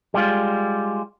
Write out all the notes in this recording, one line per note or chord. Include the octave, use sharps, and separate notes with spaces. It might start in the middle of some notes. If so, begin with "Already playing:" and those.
G3 G#3 F4